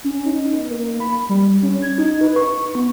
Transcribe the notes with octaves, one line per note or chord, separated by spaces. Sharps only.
C#4
D#4
B3
A#3
B5
G3
C#4
G#6
D#4
B4
C#6
B3